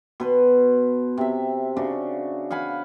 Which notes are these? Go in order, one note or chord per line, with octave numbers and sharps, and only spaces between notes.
B2 B4 C6
C3 E5
C#3 D4 F#4
F5 F#5 G#5 B5